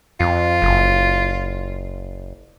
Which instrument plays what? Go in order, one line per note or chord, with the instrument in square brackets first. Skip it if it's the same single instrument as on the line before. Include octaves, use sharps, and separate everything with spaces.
[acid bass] F2 [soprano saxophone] F4
[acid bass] F#1